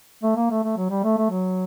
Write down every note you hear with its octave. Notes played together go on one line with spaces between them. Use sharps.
A3
A#3
A3
A3
F#3
G3
A3
A3
F#3